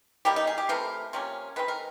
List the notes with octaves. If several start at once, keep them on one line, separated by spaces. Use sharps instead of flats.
D#3 G3 A#3 G4
D#4
G#4
G4
C3 E3 A3 C4 A#4
C3 F3 A#3 C#4
D#3 G#3 C4 B4
A#4